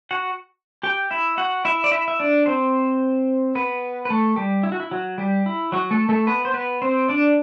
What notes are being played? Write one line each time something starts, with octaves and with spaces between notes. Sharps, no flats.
F#4 F#5
G4 G5
E4 E5
F#4 F#5
E4 E5
D5
E4 E5
E5
D4 D5
C4 C5
B3 B4
B4
A3 A4
G3 G4
E4
F#4
E4
F#3 F#4
G3 G4
E4
F#3 F#4
A3 A4
A3 A4
B3 B4
C5
B3 B4
C4 C5
D4 D5